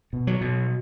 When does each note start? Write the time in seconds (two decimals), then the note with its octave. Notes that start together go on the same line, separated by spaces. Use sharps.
0.13 B2
0.27 F#3
0.41 B2